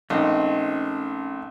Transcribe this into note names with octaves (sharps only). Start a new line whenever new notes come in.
A#1 A3 C4 C#4 D#4